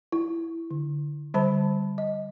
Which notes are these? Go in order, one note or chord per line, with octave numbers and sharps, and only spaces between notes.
E4
D3
D3 G3 C5 A5 B5
D#5